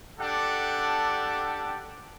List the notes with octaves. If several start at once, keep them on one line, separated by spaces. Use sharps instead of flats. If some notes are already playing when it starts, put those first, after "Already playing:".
D4 G4 A4 F#5 G5